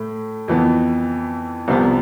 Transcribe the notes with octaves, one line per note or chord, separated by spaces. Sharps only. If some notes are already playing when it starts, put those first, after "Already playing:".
Already playing: A2 A3
F2 E3 B3
C2 C3 F3 B3